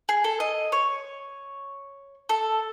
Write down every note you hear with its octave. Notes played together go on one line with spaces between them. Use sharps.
G#4
A4
D#5
C#5
A4